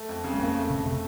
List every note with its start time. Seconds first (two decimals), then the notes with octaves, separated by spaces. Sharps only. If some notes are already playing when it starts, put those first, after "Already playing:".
Already playing: A3
0.09 F2
0.24 C#3
0.34 A3
0.39 F2 A#3
0.55 A3
0.70 F2 C#3
0.86 C3 A3